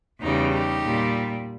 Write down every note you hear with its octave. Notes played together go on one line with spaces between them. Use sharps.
E2 C#3 G3 D#4
D#4 G4
A#2 G3